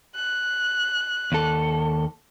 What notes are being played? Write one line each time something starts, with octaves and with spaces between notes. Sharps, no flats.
F#6
D#2 A4